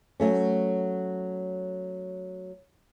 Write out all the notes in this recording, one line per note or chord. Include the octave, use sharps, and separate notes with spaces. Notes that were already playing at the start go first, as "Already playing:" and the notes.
F#3 A3 C#4